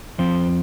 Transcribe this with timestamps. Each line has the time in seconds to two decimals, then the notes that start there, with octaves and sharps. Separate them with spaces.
0.18 F2 F3 C4 C5